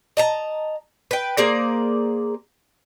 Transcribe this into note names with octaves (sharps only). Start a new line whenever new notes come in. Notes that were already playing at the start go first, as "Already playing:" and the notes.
D#5 A5 A#5
B4 G5
A#3 G#4 C5 D5